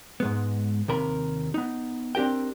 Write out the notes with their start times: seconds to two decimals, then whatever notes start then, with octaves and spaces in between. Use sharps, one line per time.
0.20 G#2 G#3 B3
0.88 D#2 C3 A#4 B5
1.54 B3 D#4
2.15 C4 D4 G4 A#4 G5